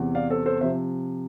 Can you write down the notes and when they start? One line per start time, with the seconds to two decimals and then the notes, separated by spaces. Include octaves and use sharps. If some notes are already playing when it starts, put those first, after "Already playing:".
Already playing: E2 C3 E3
0.15 D5 F5
0.30 A4 C5
0.46 A4 C5
0.61 C3 F3 C5 E5